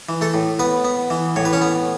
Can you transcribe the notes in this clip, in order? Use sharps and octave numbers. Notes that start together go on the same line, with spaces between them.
E3
A3 A4
A2
B3 B4
B3
E3
A2 C#5
B4
C#4 C#5
B3